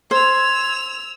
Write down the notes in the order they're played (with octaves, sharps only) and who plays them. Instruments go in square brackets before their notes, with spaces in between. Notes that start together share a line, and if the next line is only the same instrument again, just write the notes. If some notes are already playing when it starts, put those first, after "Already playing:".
[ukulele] C5 [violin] E6 F7 [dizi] G#6